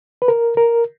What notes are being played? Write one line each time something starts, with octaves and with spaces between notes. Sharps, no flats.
B4
A#4
A#4